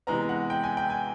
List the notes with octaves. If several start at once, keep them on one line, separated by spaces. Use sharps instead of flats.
C3 E3 G#3 B3 A#5
F#5
G5
G#5
G5
G#5